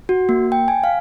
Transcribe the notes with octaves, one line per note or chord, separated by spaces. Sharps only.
F#4
A#3
G5
G#5
F5